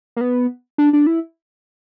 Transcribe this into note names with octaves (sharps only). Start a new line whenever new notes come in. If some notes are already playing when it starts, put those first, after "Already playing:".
A#3
B3
D4
D4
E4